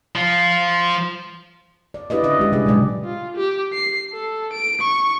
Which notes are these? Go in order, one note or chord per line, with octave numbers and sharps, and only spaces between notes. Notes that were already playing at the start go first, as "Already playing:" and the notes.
F3 F4
D5
D4 E4 G4 B4 D5 D#5
D3 C#4 D#5 E5
G#3 G4
C3 G3 D4 G4 G#4
A#2 C#3 F#3 G#3 D5
F4
G4
C7
A4
D7
C#6